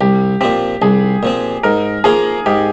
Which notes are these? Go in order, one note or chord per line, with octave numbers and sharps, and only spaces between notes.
C2 G4
A#2 F3 C4 G4
C2 G#4
A#2 F3 C4
G#2 A#4
F3 A#3 F4 G#4
G#2 G4